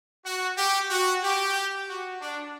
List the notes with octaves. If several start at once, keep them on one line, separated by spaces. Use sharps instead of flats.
F#4
G4
F#4
G4
F#4
D4